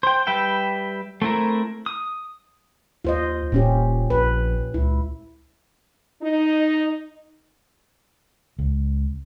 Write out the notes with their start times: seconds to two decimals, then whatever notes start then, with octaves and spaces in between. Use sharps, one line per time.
0.03 C5 G5
0.27 G3 B4 E5 G5
1.22 A3 C4 E4 A#4
1.86 D#6
3.05 D#2 F4 C5 D#5
3.52 D#1 A#2 C#4 G4
4.10 A#1 B4
4.74 C#2 E4
6.22 D#4
8.59 C#2